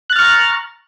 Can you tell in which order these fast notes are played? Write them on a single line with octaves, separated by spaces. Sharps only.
F#6 A6 F6 C#6 A#5